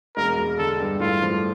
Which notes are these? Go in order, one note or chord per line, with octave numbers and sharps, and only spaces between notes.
E1 A#4
E1
D3 A4
G2
A2 F4
F3